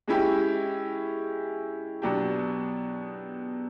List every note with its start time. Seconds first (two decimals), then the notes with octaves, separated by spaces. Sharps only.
0.08 G#3 C#4 E4 G4
2.02 B2 F#3 B3 D4 G4